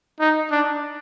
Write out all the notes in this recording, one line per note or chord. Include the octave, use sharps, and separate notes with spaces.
D#4
D4